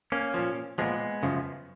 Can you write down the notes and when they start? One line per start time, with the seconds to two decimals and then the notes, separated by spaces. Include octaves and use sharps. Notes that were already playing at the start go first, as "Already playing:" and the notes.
0.12 A#3 C#4
0.34 A#2 F3
0.78 A#2 F3 G#3 B3
1.23 F#2 C#3 F3